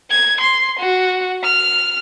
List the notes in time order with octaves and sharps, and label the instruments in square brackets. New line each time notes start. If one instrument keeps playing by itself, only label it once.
[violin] G#6
C6
F#4
F6